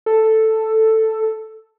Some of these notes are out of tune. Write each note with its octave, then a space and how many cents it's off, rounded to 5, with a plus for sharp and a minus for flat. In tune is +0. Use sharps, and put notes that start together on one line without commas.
A4 +5